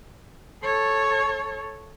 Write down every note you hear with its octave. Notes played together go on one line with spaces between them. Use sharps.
A4 C#5